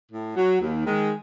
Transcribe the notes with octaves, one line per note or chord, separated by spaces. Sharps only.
A2
F#3
D#2
D#3 G#3